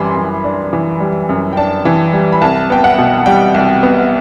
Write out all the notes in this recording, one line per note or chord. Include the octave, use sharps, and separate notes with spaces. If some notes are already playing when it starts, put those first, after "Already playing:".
Already playing: F#2 E3 G3 B5 C6 D6
F#2
D4
E3
G3
F#2
G5
D4 A5
E3
G3
B5
C2 A5
B3 G5
F#5
B2
G3 G5
C2
B3